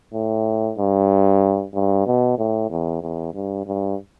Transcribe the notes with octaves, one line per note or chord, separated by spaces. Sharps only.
A2
G2
G2
B2
A2
E2
E2
G2
G2